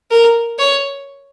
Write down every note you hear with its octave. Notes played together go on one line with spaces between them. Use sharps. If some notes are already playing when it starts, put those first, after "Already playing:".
A#4
C#5